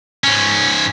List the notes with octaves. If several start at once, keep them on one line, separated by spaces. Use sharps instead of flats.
G#2 C#4